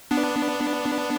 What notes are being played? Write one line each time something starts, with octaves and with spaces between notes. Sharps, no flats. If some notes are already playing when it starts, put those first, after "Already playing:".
B3 D4